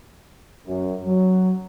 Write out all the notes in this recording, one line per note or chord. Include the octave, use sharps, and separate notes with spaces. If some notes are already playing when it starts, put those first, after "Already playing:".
F#2
F#3